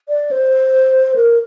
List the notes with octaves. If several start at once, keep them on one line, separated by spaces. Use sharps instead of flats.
D5
C5
A#4